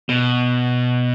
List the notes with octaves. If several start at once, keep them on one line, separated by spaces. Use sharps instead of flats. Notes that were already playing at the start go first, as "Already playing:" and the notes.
B2